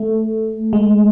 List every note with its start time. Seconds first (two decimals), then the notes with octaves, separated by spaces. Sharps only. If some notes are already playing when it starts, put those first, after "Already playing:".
Already playing: A3
0.73 G#3